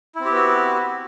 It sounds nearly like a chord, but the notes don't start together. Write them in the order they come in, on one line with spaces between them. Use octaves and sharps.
E4 C4 G4 B3 F#4